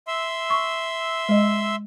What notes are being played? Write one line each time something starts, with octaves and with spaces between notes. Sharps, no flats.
E5 C6 E6
C#6
G#3 D#5